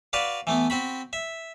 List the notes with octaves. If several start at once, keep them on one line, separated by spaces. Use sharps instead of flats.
F#4 B4 D5 F5
E3 A3 B3
C4 F#4 B5
E5